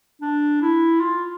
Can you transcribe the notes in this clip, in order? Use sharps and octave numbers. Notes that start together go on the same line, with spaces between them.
D4
E4
F4